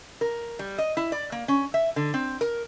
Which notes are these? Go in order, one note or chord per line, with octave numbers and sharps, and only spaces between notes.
A#4
G3
D#5
E4
D5
A#3
C#4
E5
D3
C4
A#4